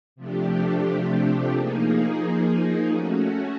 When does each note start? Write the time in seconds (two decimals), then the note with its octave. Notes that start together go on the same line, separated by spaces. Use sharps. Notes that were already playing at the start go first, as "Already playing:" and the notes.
0.16 C3 F3 A3 D4 G4
1.53 F3 A#3 D#4 G#4
2.90 A3 C#4 F#4